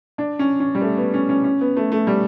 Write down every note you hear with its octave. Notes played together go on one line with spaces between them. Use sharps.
D4
C#4
C#4
G3
A3
B3
C#4
C#4
C#4
B3
A3
A3
G3